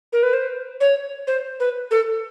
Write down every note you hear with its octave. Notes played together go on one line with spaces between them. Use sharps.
A#4
B4
C5
C#5
C5
B4
A4